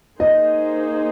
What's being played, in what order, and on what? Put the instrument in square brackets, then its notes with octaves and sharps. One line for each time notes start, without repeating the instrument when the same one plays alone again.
[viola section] A#3 D#4 G#4 C5 [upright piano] D#5